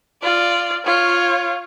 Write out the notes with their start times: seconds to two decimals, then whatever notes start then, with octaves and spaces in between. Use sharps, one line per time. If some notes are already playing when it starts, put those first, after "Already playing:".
0.23 F4 D5
0.85 F4 C#5